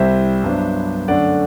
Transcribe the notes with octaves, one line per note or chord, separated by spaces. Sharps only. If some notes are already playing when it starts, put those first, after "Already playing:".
Already playing: C2 C3 G3 C4 E4 C5 E5
G2 F#3 B3 D4
F#2 D3 A3 D4 D5 F#5